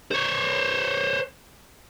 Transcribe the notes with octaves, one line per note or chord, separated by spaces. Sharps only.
C5 C#5